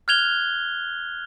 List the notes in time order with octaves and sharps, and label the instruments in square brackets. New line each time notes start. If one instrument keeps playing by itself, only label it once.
[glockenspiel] F6 F#6 G#6 F7 G7